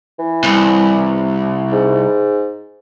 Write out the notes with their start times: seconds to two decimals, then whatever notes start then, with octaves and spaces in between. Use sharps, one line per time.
0.19 E3
0.44 C2
1.72 G#2